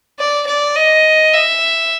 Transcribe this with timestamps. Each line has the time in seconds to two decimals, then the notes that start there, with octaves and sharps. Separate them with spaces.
0.19 D5
0.47 D5
0.75 D#5
1.33 E5